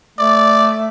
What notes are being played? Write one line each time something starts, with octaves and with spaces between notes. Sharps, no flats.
A3 D5